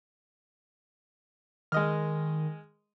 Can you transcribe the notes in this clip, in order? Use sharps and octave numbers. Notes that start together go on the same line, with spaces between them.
D#3 G#3 D#5 F6